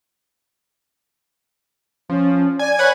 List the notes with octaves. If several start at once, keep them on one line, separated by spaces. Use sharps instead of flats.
F3 C#4
D5 G#5
B4 C#5 F#5 G#5